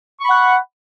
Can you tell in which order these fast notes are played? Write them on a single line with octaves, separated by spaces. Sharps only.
C#6 B5 F#5